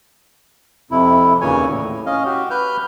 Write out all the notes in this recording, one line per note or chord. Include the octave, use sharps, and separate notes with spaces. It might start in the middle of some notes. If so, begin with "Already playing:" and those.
F2 C3 E4
D#2 A#2 C#3 E3 C#5 G#5
A2
C#4 D#5 F5
F#4 G4
B4 F6 G6